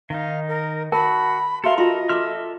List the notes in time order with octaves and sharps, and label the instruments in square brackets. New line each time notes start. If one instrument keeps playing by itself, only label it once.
[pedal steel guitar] D#3 D#4 [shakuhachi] F5
[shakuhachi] A#4
[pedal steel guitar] F#4 [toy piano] A#4 [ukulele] A5 [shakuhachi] B5
[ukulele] F#4 E5 F5 [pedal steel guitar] A4 A#4 [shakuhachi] C6
[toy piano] F4 F5 C6 [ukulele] F#4 B5 [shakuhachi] D#5
[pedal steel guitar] A4 E5 F6 [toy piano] C6 D6